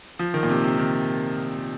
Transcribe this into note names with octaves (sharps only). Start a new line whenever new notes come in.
F3
D#3
A#2
C3
C3
D#3